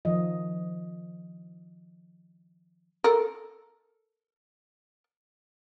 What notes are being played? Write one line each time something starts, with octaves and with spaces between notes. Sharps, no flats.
D#3 F3 D#5
A4 A#4